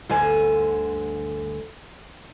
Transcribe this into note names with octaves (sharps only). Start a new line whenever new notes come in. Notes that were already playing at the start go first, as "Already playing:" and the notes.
D2 G2 D3 C5 G#5